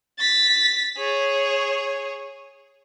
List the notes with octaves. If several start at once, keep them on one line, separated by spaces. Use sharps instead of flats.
A6 B6
G#4 C#5